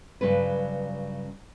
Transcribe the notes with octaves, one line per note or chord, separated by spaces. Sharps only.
G2 C#3 F#3 B4